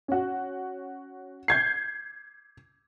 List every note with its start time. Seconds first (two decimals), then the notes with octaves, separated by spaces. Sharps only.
0.08 C#4 F#4
1.48 G6 G#6 C7